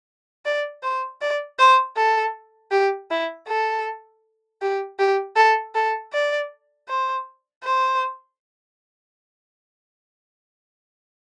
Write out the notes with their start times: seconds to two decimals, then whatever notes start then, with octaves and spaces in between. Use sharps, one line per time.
0.45 D5
0.83 C5
1.21 D5
1.59 C5
1.97 A4
2.71 G4
3.10 E4
3.48 A4
4.62 G4
4.99 G4
5.36 A4
5.75 A4
6.12 D5
6.88 C5
7.64 C5